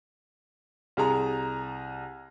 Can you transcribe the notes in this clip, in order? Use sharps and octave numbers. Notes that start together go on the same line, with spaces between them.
C2 G#4 A#5